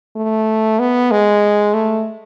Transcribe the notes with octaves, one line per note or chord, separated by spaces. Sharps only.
A3
B3
G#3
A3